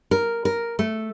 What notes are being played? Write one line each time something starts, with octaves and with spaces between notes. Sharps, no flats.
A#4
A#4
A3